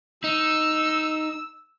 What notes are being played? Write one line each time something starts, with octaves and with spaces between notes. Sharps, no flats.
D#4 E6